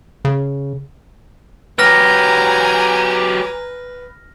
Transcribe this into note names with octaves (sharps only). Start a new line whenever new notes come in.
C#3
F#3 G4 B4 G#5 A#5 F6 A#6